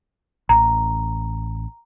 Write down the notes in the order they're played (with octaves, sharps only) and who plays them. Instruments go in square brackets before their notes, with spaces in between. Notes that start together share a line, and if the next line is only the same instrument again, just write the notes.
[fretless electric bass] A1 [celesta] A#5